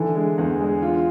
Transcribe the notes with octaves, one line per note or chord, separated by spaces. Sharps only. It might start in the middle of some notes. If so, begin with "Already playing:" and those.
Already playing: D3 E3
G#3
E2
G#3
F4